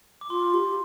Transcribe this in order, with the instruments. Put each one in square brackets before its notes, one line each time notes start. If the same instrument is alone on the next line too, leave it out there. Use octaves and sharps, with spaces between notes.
[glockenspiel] D6
[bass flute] F4 [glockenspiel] C6
[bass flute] G4